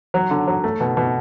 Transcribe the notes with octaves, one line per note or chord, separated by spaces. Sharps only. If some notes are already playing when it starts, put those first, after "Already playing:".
F#3
D3
F#3
A3
B2
B2